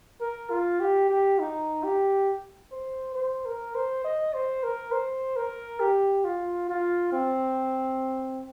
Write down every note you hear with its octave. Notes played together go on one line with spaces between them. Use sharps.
A#4
F4
G4
G4
D#4
G4
C5
C5
A#4
C5
D#5
C5
A#4
C5
A#4
G4
F4
F4
C4